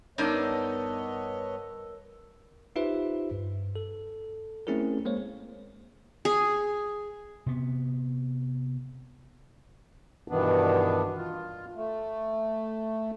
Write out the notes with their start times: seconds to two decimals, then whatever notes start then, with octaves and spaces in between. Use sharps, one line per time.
0.18 G2 B3 D4 D#4 A#4 C#5 D#5 E6
2.76 D#4 F4 G4 B4 C5 E5
3.31 G2
3.75 A4
4.67 A3 C4 C#4 E4 G#4 A#4
5.05 G#3 A#3 C5 C#5
6.25 G#4
7.46 C3 B3
10.28 G2 B2 D#3 E3 B3 D4
11.16 F4
11.75 A3